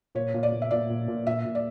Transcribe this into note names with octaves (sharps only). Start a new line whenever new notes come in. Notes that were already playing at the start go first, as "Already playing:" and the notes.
A#2 C#5
A#2
D5
A#2
E5
A#2 D5
A#2
A#2
A#2 E5
A#2
D5